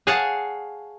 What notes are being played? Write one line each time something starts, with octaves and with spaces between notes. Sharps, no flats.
G#4 C#5 F5 F#5 A5